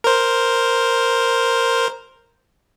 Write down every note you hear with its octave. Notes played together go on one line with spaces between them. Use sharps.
A#4 C5